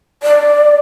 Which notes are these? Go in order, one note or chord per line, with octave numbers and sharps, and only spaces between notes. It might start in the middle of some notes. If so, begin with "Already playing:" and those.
D5